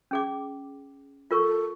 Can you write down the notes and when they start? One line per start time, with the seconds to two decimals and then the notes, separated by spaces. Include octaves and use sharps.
0.11 C#4 G#4 D6
1.31 F4 A4 A#4 C#6